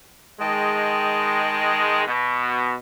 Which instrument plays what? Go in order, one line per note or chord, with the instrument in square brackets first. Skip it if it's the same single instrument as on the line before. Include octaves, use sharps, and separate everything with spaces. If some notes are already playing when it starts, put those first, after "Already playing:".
[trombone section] D#3 G#3 [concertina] D#5 G5 A5
[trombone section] B2